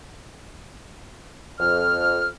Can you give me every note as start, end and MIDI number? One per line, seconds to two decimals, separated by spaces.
1.60 2.29 41
1.60 2.29 89